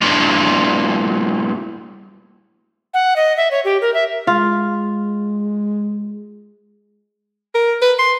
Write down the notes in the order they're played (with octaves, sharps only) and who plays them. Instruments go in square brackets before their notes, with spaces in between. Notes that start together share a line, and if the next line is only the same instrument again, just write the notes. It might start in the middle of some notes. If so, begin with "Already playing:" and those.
[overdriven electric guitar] G2 A#2
[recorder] F#5
D#5
E5
C#5
G4
A#4
E5
[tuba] G#3 [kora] F4
[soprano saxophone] A#4
B4
C6